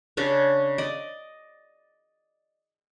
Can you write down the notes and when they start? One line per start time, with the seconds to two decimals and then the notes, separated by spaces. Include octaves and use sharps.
0.17 C#3 C#4 D4 C#5
0.78 D5 D#5